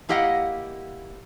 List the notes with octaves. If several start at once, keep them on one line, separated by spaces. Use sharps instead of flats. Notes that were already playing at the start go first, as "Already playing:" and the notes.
A#3 E4 G4 D#5 F5 F#5